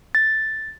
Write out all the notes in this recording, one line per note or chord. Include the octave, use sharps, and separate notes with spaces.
A6